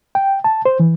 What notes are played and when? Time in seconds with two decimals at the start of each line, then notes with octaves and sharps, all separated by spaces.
0.15 G5
0.44 A5
0.65 C5
0.80 E3